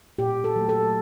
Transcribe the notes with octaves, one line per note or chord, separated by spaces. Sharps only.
A#2 G4
A4
F#3
A3
A4